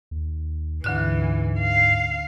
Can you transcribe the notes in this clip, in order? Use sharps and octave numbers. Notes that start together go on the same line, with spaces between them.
D#2
D2 G#2 D3 E3 F#6
F5